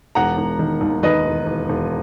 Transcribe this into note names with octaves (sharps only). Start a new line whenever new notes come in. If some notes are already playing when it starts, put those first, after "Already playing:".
E1 F#5 A#5
E1
D#3
D#2
D#2 B4 D#5
E1
E1
E1